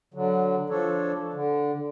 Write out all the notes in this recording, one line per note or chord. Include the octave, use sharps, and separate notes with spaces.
D3 F#3
F3 D4 A4 C#5
D3